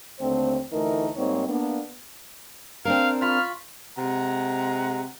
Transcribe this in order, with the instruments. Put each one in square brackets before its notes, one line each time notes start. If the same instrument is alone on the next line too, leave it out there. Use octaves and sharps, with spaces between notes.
[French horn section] D#2 D3 A3 C4 C5
D2 E3 A3 D#4 A#4
G#2 G3 A#3 C4 D#4 C#5
A#3 B3 D4
[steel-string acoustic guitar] C4 D4 A#4 [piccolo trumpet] F5
[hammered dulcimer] F4 B5 C#6 [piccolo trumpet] F6
[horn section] C3 G#3 F#5 A#5